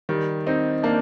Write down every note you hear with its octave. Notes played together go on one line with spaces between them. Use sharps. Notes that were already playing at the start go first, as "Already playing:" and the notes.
D#3 G3
C4 D#4
A#3 D4